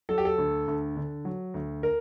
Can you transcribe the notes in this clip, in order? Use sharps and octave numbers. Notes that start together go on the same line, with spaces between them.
F#3 A4
G4
A4
D2
D2
D3
F#3
D2
A#4